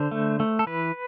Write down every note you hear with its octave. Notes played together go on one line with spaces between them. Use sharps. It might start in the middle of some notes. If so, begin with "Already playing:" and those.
Already playing: D3 C5
A3
A3
A4
E3 B4